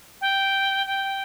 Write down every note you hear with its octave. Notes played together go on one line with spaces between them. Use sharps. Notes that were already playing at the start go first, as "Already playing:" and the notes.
G5
G5